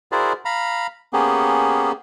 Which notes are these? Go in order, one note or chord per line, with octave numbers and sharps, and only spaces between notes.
E4 F#4 G#4 A#4 C5 D5
F5 A#5 B5
A#3 B3 C#4 G4 G#4